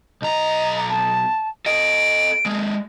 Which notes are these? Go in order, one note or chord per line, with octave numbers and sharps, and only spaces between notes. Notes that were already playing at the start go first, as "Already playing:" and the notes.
B1 D#5 A#5
A5
A4 D#5 D7
G#3 A#3